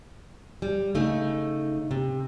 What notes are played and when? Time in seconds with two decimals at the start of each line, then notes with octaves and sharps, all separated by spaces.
0.62 G3
0.95 C#3 A3 D#4
1.91 C3